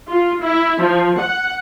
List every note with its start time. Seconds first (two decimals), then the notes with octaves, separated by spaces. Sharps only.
0.12 F4
0.45 E4
0.82 F3
1.19 F#5